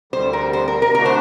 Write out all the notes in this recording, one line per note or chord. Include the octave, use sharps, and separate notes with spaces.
D2 D3 G3 C5
A#4
C5
A#4
A#4
D3 A3 D4 F#4 A#4
C5